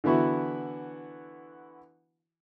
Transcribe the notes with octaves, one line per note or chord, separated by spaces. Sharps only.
D3 E3 B3 E4 F#4